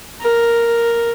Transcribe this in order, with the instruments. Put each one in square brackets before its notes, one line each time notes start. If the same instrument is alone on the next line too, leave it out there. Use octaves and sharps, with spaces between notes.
[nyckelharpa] A#4